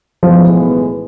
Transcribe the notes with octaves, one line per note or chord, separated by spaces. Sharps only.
B1 A2 E3 F3 G#3 B3